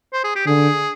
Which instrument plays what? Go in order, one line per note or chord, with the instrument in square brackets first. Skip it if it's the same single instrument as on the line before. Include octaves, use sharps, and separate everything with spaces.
[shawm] C5
G#4
G4
[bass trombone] D3 [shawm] G#4